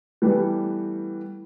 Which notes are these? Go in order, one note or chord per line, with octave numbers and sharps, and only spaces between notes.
E3 G3 A3 B3 G4